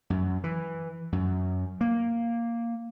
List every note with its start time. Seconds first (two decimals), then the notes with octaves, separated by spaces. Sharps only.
0.10 F#2
0.44 E3
1.12 F#2
1.81 A#3